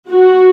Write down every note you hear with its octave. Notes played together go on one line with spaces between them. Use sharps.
F#4